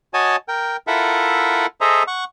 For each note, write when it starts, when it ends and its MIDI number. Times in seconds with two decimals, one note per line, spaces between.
0.14 0.36 66
0.14 0.36 73
0.14 0.36 75
0.14 0.36 80
0.14 0.36 81
0.48 0.77 70
0.48 0.77 79
0.87 1.66 64
0.87 1.66 65
0.87 1.66 69
0.87 1.66 70
0.87 1.66 76
0.87 1.66 78
1.81 2.03 68
1.81 2.03 69
1.81 2.03 72
1.81 2.03 75
1.81 2.03 76
1.81 2.03 82
2.07 2.24 78
2.07 2.24 85